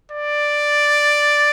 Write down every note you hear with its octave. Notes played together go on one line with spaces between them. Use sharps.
D5